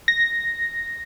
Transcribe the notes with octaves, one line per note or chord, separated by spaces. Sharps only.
A#6